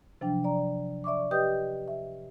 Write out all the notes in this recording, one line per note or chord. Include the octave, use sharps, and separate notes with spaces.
C3 F3 F#3 D4 G5
D5 A#5
D5 E5 C#6 D6
G4 B4 D#5 G5 D#6 G6
E5